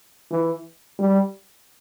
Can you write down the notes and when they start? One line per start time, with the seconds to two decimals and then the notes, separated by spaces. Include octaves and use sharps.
0.31 E3
0.99 G3